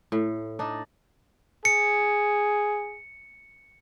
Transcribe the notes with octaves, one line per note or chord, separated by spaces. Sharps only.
A2
D4 D#4
G#4 C#7